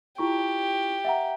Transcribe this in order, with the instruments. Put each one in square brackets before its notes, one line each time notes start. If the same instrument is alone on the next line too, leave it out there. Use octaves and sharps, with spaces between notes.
[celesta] E4 F4 C#6 [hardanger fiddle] G4
[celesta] E5 F#5 A#5